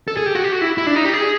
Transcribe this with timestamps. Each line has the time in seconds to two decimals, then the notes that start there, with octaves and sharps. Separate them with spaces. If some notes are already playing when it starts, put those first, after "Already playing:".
0.08 A4
0.17 G#4
0.26 G4
0.35 F#4
0.44 G4
0.52 F#4
0.61 E4
0.78 E4
0.87 D4
0.95 D#4
1.05 G4
1.13 G#4